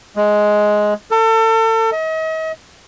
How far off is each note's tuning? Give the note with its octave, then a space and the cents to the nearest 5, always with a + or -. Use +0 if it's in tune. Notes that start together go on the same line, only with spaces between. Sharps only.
G#3 +10
A4 +35
D#5 +40